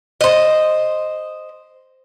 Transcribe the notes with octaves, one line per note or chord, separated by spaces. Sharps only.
C5 D#5